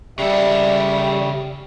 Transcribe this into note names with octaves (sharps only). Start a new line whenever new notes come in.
C#3 G3 G4 A4 D5 E5